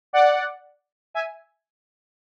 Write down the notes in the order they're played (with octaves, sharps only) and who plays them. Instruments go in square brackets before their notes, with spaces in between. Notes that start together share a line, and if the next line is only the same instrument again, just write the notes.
[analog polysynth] D5 F#5
E5 G#5